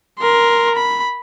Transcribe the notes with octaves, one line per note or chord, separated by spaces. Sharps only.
A#4 C6
B5